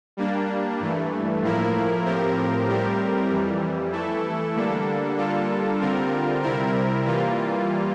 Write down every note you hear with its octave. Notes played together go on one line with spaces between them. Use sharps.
G3 A#3 D4
G2 E3 A3
A2 F3 A#3 E4 A#4
A2 F3 C4 G4 A#4
A2 G3 C4 G4 A#4
F2 E3 G3
E3 A3 E4 A4
D3 G3 A#3 D4 A4
G3 A#3 D4 F4 A4
D3 G3 C4 F4 A#4
C3 G3 C4 E4 A#4
E3 G3 A#3 F4